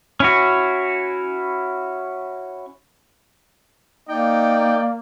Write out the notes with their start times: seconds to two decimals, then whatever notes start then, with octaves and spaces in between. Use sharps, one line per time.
0.20 C#4 E4 F#4
4.09 A#3 D#4 D5 G5